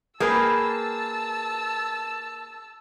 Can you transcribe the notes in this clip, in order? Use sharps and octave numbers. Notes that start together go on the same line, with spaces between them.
A#3 G#4 A#4 B4 G5 A5 E6